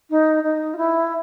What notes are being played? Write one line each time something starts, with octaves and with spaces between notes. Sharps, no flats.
D#4
D#4
F4
E4